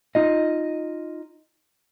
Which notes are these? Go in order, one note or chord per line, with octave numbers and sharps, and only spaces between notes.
D#4 F4 D#5